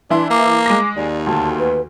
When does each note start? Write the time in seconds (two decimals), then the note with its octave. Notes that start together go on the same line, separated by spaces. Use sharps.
0.10 E3 D4 E4 E5 C6
0.30 A#3 D6
0.66 G#3 D6 A#6
0.96 D#2 D5
1.27 D2 A5
1.58 B4